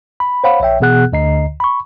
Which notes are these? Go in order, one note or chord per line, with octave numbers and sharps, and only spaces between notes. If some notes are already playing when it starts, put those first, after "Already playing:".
B5
C5 C#5 F5 F#5 B5
A#1 C#5 E5 G5
B2 E3 B3 G#4 F#5 F#6
D2 D3 D#5 A#5 C7
B5 C#6